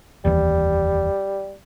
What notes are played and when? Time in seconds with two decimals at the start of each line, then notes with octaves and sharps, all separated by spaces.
0.25 F1 D#2 E3 G3